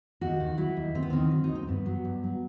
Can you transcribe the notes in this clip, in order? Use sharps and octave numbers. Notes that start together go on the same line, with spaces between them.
D#2 F#4
D#3
F#3 E4
D#2
D#2 C4
B3
D#3 C4
F#3
D#4
D#2
C4
G2 B3
F#3
G2
F#3